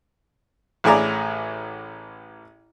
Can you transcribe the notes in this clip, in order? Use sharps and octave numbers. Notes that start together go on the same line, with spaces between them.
A1 A2 G#4 D5 A#5